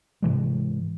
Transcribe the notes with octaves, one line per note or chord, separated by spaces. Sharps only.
G#2 C3 E3 G#3